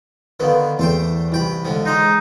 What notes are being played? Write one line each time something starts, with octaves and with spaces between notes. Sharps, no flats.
D3 D#3 B3 B4 F5
E2 A3 C5 G5
C2 E3 G5 B5
C#2 D3 F3
G#3 D#4 C5